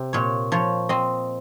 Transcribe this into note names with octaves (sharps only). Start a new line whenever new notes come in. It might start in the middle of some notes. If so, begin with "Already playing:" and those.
Already playing: C3
A#2 C#5
F3 C#5
C4 D#5